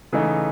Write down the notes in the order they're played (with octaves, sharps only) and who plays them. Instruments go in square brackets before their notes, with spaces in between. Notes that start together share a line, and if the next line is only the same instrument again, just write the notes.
[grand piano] C#3 E3 A3 D#4